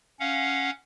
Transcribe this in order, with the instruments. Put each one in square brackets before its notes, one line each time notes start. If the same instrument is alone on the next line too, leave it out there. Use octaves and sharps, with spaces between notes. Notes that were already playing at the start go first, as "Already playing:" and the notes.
[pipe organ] C#4 F5 F#5